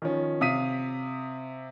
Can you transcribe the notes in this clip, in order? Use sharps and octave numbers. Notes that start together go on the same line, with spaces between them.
D#3 F3 C#4
C3 F5 D#6 B6 D#7